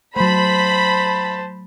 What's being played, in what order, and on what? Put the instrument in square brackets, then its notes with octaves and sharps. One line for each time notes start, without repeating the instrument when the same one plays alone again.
[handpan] F#3 A3 [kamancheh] C5 A5 [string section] B5